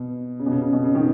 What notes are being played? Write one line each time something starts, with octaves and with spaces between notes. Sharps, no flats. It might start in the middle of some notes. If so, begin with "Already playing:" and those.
Already playing: B2
C#3
B2
C#3
C#3
B2
C#3
B2 D#3